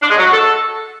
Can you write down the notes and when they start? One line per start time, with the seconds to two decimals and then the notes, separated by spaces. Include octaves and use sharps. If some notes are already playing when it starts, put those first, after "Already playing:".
0.03 D4
0.10 G#3
0.18 F#3
0.25 F#4
0.33 A4